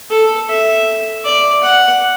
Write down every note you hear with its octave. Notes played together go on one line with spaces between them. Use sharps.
A4
E5
D5
F#5